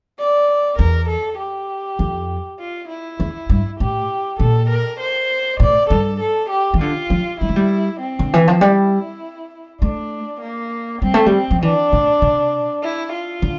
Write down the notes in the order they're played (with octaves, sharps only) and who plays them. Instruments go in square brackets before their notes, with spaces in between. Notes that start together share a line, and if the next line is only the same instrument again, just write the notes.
[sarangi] D5
[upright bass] E2 [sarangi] A#4
[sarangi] A4
G4
[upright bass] F2
[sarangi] F4
E4
[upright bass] E2
G2
[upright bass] A2 [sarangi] G4
[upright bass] A#2 [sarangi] A4
[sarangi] A#4
C5
[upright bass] A2 [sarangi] D5
[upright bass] G2 [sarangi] A4
[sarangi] A4
G4
[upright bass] E3
[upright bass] D3 [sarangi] F4
[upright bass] F3
[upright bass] G3 [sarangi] E4
[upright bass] A3
G3
[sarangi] C4
[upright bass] D3
E3
F3
[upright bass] G3 [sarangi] E4
[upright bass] A3 [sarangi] D4
[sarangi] A#3
[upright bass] G3 [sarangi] C4
[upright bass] A3
G3
F3
[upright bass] E3 [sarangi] D4
[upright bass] A2
C3
[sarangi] E4
F4
[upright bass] D3